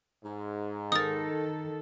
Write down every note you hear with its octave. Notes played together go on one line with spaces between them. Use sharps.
G#2
D#3 D#4 A4 A#4 D#6 A6